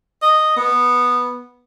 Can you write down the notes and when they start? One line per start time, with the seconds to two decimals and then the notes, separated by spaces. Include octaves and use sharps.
0.22 D#5
0.57 B3